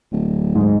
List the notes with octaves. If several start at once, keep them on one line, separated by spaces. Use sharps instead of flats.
D1
G#2